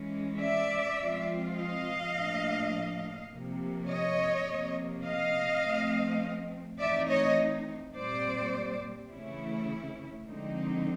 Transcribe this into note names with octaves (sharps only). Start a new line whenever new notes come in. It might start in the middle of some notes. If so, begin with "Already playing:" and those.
Already playing: E3 G#3 C#4
D5 E5
F3 G#3 C4 F4
D#5 F5
A2 F3 A#3 D4
C3 F3 A#3
C#5 D#5
C3 F3 A#3
D#5 F5
F3 A3 C4
E3 A3 C4 D#4 D5 E5
C#5 D#5
A#2 G3 C4 C5 D5
C#3 E3 A3 C#4 E4
D3 F3 G#3 C4 D#4